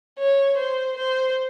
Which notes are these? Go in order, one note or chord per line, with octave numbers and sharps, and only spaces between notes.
C#5
C5
C5